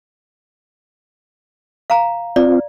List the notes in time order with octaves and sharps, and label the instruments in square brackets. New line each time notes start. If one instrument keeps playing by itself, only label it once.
[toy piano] F5 A#5
[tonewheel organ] C4 F4 [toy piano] D5